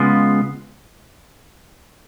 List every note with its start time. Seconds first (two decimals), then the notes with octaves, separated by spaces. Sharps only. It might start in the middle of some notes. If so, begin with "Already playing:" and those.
Already playing: C#3 G#3 B3 F4